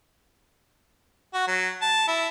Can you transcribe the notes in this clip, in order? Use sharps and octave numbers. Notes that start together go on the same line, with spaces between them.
F#4
F#3
A5
E4